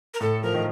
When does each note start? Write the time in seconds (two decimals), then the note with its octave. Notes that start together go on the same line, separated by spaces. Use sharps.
0.14 A#4
0.20 A2 A4
0.43 F3 A#4
0.54 D#3